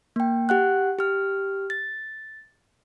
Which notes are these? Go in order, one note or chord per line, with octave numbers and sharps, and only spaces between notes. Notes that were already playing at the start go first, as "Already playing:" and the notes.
A#3 G5
G4 F#5 F#6
G4 F6
A6